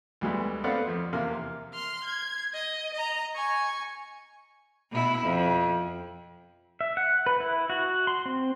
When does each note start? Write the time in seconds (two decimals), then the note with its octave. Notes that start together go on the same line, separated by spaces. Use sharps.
0.21 D2 G3 G#3 B3
0.64 A3 B3 C4 D5 F5 F#5
0.87 F2
1.13 E2 C3 A#3 A#4 F5
1.74 C6 F6
2.04 G#6
2.54 D#5
2.94 D#5 A#5
3.35 G#5 C#6
4.91 B2 E4
5.23 F2
6.81 E5
6.97 F#5
7.26 B4
7.40 E4
7.70 F#4
8.07 C6
8.26 C4